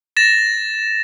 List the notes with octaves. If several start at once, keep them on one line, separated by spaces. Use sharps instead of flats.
A6 A#6 E7